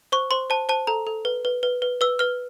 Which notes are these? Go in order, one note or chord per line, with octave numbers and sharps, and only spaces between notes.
C5 C#6
C5 C6
C5 A5
C5 A5
A4 A#5
A4
B4
B4
B4
B4
B4 E6
B4 F6